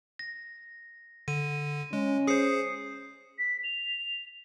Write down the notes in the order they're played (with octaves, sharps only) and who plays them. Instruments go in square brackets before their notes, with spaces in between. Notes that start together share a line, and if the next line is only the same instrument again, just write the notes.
[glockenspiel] A#6
[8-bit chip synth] D3 [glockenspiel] D#7
[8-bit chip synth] G#3 [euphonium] C#4
[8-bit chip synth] G#4 C5 [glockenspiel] D#6 C7 C#7
[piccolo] B6
F7